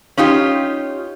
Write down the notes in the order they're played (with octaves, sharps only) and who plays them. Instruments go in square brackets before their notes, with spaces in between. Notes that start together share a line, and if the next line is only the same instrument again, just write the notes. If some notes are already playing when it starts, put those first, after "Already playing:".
[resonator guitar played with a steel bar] C#4 D#4 F4 G4